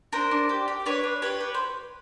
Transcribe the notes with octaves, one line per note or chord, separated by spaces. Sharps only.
D4 A#4 C5
D4
G4
G4
D4 B4 C#5
D4
G4 B4 C#5
G4
C5